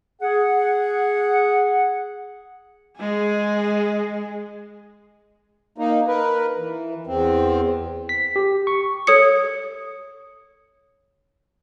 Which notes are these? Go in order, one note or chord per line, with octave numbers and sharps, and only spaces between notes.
G#4 F#5
G#3 G#4
A#3 D#4
A#4 B4
E3
E2 C4
B6
G4
C#6
A4 C#5 D#6 C#7